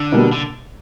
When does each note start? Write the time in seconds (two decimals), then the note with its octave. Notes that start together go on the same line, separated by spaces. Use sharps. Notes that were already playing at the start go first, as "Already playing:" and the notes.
Already playing: D3
0.12 B2 G3 A#3
0.33 D3